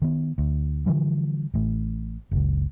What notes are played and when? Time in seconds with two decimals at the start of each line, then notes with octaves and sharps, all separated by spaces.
0.02 D#3 B3
0.38 D2
0.86 D3 E3 F3 G3
1.54 A1 A2
2.31 F#1 C#2